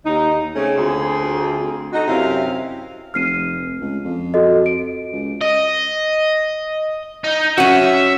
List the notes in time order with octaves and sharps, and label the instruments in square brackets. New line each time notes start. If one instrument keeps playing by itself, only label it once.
[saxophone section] D#2 D#4
C#3 A3 C4 C#4
D2 C4 F4 G#4
D#4 F#4 A4 D#5
F#2 C3 C4 E4 F5
[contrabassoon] F1 [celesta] F6 C7 D#7
[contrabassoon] C#2
F2
[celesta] F#4 A4 D#5
D7
[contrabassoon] C#2
[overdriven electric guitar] D#5
D#4
[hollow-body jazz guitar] C#4 F#4 [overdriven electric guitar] E5